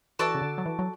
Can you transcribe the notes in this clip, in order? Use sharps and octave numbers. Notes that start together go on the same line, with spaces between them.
E3 F#4 A4 D5 A5
C#3
D3
F#3
E3
F#3